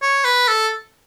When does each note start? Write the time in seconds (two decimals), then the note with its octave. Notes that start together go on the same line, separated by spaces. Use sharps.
0.02 C#5
0.24 B4
0.48 A4